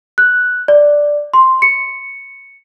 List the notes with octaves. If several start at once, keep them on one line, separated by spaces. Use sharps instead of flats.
F#6
D5
C6
C#7